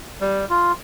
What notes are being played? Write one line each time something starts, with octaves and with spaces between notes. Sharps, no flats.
G3
F4